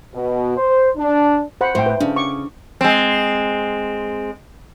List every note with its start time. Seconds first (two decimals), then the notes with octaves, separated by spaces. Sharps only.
0.13 B2
0.57 C5
0.96 D4
1.61 C5 F#5 B5
1.75 A2 C5 G5
1.86 B4
2.00 C#3 D4
2.16 C#6 D6
2.81 G#3 C4